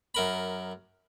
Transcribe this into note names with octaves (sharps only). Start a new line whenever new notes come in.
F#2 A#4 B5